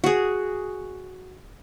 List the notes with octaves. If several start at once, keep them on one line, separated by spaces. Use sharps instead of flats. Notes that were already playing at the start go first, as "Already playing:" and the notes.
F#4 G#4